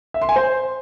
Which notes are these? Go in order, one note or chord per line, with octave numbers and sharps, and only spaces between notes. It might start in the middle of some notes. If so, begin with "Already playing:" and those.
E5
C6
G#5
C5